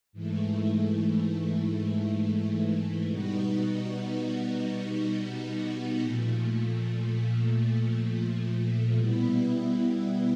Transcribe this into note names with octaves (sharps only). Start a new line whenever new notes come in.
G#2 E3 A3
B2 G3 B3 D#4 F#4
A#2 F3 A3
B2 G3 B3 E4